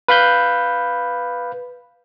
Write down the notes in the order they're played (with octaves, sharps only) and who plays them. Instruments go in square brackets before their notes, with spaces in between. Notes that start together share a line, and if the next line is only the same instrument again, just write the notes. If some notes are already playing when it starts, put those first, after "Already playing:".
[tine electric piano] B4 F5 B5 G6